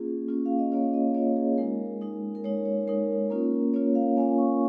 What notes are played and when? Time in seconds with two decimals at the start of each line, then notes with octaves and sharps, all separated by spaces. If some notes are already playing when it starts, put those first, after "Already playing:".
Already playing: A#3 C#4 F4 G#4
0.29 A#3 C#4 F4
0.46 F5
0.59 D#5
0.72 A#3 C#4 F4 C#5
0.94 D#5
1.15 A#3 C#4 F4 C#5
1.36 G#4
1.58 G#3 D#4 A#4
2.01 G#3 D#4
2.35 A#4
2.44 G#3 D#4 C#5
2.65 C#5
2.87 G#3 D#4 A#4
3.30 A#3 C#4 F4
3.74 A#3 C#4 F4 C#5
3.95 F5
4.16 A#3 C#4 F4 G#5
4.38 C#6